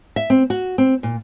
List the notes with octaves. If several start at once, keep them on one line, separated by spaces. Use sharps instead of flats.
E5
C4
F#4
C4
A#2